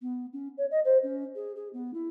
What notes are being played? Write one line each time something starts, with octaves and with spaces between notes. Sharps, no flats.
B3
C#4
C#5
D#5
C5
C#4
G#4
G#4
B3
E4